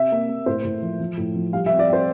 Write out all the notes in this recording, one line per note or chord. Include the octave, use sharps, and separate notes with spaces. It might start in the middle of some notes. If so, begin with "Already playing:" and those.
Already playing: C3 E5
A#3
A#3
A2 C5
A2
F3
F3
A2
F3
G3 F5
E5
C4
D5
C4 C5